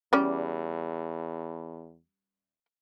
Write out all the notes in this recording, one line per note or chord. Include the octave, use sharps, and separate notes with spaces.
E2 G3 C#4 D5